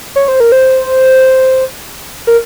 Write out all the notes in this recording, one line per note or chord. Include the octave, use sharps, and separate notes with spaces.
C#5
C5
A#4
C5
A#4